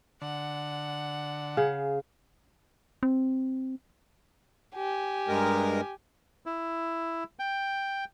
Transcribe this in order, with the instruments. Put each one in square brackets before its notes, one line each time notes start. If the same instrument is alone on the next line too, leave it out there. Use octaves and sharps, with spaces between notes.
[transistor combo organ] D3 [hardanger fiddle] F#5
[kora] C#3 [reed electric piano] G#4 F5
[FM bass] C4
[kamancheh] G4 G#5
[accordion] G2 G#3 A#4
[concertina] E4
G5